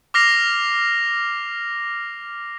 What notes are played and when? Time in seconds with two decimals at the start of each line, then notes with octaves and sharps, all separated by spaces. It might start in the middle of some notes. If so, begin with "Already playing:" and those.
0.14 D6 F6 A#6 C7 F7